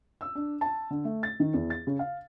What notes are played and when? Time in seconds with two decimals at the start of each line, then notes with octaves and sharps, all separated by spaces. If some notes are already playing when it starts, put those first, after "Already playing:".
0.21 E6
0.35 D4
0.61 A5
0.90 D3
1.05 A3
1.23 A6
1.40 D#3
1.54 E2
1.70 A6
1.87 C#3
1.99 F5